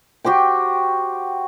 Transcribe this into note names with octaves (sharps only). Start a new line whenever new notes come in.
F#4 G4 C5 G5